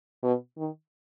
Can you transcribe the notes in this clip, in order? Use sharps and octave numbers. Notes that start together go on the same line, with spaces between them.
B2
D#3